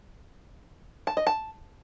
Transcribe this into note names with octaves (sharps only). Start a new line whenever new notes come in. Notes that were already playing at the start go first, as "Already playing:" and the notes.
A5
D#5
A5